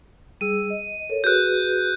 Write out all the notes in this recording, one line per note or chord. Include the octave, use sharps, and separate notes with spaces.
G3 G#4 E6 D#7
D#5
A4 A#4 C#5
F#4 G#4 B4 F#6 G6